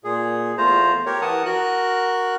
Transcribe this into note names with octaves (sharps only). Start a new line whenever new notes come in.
A#2 G#4
E2 A3 F4 C5 A#5
G4 A#4 C#5
E3 A#4 F#5 A5 D#6
F#4 A#4 F#6